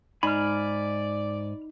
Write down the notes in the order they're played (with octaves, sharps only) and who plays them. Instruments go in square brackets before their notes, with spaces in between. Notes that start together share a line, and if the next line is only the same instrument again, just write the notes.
[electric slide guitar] G#2 G#5 [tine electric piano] D#4 [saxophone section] D5 [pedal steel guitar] B5 F6